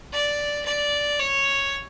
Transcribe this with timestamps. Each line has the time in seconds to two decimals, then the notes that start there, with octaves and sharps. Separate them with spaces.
0.13 D5
0.65 D5
1.18 C#5